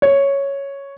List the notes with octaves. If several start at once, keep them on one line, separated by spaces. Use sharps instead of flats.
C#5